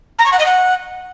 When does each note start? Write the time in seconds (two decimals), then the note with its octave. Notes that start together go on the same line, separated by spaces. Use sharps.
0.19 A#5
0.25 C#6
0.32 F#5
0.39 D#5
0.46 F#5